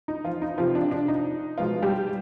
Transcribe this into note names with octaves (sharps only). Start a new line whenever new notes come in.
D#4
F3 F4
D#4
C3 F3 C4 F4
D4
D4
D#4
B2 F3 G#3 B3 F4
G3 G4